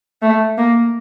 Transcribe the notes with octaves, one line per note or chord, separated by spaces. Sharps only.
A3
A#3